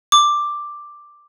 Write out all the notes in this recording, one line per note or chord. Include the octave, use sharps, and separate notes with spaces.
D6